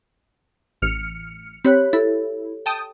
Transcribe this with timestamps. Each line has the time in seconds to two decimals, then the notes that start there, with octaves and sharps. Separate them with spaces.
0.82 A1 F6 C#7
1.65 C4 G4 C#5 B5 F#6
1.93 E4 A4
2.66 G5 A5 D#6